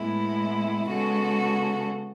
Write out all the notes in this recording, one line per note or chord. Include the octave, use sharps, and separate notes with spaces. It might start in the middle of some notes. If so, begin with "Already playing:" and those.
Already playing: A2 G#3 B3 E4
C#3 G#3 B3 F#4 A4